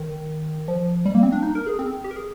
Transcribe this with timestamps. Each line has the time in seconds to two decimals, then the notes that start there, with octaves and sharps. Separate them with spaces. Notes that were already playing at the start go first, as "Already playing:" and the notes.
Already playing: D#3
0.68 F3
1.06 G3
1.15 A#3
1.23 C4
1.32 D4
1.43 D#4
1.55 A#4
1.66 G#4
1.79 C4
2.04 G4
2.11 A#4
2.16 G#4